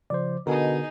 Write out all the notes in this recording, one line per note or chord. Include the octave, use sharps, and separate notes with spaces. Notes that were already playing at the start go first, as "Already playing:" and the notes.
C#3 F3 C5 D5
B2 D3 D#4 G#4 A#4